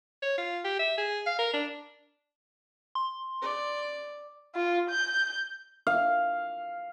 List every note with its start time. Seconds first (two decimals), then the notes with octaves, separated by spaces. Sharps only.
0.22 C#5
0.38 F4
0.64 G4
0.79 E5
0.98 G#4
1.26 F5
1.39 A#4
1.53 D4
2.95 C6
3.42 D5
4.55 F4
4.90 G6
5.87 F5